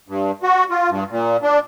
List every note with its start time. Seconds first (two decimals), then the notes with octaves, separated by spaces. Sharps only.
0.08 G2
0.43 F#4
0.70 F4
0.90 G2
1.11 A#2
1.43 D4